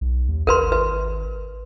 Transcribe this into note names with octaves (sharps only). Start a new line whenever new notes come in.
B1
D#2
G#1 A#4 B4 C6
B4